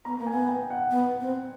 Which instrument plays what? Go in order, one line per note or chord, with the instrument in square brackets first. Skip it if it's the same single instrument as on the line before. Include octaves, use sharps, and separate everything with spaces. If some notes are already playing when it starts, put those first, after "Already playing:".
[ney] B3 [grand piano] A#5
[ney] A#3
[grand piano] G#5
[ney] B3
[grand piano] G5
F#5
[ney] B3
C4